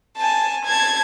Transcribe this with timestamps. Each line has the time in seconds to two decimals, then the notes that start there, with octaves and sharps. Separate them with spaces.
0.17 G#5 A5
0.65 A5 G#6